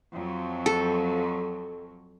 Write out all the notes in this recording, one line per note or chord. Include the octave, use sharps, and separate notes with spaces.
F2 F#3
A4